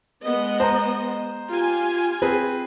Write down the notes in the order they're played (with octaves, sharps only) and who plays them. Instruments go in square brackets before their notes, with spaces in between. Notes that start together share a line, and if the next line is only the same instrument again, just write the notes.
[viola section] G#3 B3 D#5
[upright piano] C5 A#5
[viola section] F4 G4 G#5
[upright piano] C4 G#4 B4